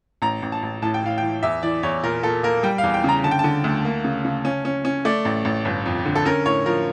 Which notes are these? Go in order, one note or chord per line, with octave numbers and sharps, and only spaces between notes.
A1 A#5
A1
A5
A1
A2 A5
G5
A2 F5
E3 G5
E2 E5
E3 D5
E2 C#5
A#2 A#4
A#2 A4
A#3 A#4
G3 G5
F5
E2
G5
C#3 A#5
D3 A5
G5
D3 A5
D2
A#3
C#3
C#3
C#4
C#4
C#4
A3 D5
A1
A1
G1
F2
D3
A4
C#4 A#4
A2 C#5
F3 A#4